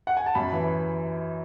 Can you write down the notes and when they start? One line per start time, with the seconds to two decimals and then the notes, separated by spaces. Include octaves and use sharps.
0.07 F#5
0.17 G#5
0.26 A5
0.35 F#2 B5
0.53 E3